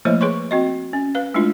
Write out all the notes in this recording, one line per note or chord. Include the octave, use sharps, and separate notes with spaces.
F3 A3 A#3 E4 C#5 D#5
G#4 B4 C#5 C6 C#6
C4 F#4 D#5
C#4
B4 F5
G#3 A3 D4 E4 F4